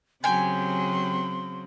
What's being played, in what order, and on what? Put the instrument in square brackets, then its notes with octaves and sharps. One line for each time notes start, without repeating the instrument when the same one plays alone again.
[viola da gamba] C#3 F#3 C4 [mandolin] G4 G#5 [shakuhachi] C6